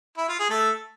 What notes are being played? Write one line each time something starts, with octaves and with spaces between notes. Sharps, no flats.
E4
F4
G#4
A3 A4